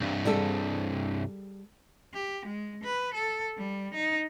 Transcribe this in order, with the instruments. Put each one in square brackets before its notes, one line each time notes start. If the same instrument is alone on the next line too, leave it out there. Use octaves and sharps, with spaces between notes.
[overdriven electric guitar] C2 G2
[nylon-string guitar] G3 G#4 A4
[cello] G4
G#3
B4
A4
G3
D#4